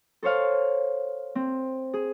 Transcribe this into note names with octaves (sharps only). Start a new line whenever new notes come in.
A4 C5 C#5 F5
C4
G#4